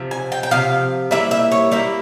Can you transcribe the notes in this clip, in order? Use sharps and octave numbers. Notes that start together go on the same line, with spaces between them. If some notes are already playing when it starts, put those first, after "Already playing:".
Already playing: C3 F3
G#5
G5
G5
C3 F3 F5
G3 A#3 E4 E5
E5
C#5
G3 A#3 E4 C5